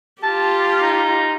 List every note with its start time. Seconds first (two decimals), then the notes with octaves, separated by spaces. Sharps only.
0.23 F4 G4 A5
0.82 D#4